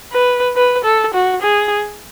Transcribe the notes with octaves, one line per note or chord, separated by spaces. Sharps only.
B4
B4
A4
F#4
G#4